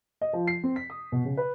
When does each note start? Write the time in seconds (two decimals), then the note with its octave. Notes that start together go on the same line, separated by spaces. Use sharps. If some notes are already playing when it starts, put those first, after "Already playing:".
0.21 D#5
0.33 F3
0.47 C7
0.64 C4
0.76 B6
0.90 D#6
1.12 B2
1.25 C#3
1.37 B4